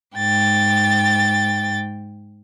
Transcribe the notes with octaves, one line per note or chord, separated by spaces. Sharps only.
G#2 G5 A6